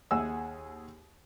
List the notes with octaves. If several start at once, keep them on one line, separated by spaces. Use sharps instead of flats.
D#2 G#4 F#5 G#5 E6